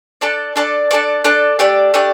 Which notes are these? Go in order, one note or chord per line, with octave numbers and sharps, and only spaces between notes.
D4 A4 D5 A5
D4 A4 D5 A5
D4 A4 D5 A5
D4 A4 D5 A5
A3 D4 G4 D5
A3 D4 G4 D5